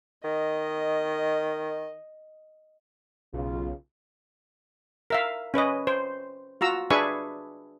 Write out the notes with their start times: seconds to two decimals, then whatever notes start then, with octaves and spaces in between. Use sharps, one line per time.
0.24 D#3 D#5
3.33 B1 C#3 F4
5.10 A#4 E5 F5
5.54 C#4 B4 C#5 D#5
5.87 C5
6.61 F4 F#4 A#5 E6
6.90 D4 G#4 B4 E5 G#5 C#6